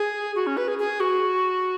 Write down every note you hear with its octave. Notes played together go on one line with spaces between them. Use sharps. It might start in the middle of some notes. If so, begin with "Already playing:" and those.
Already playing: G#4
F#4
C#4
B4
G#4
G#4
F#4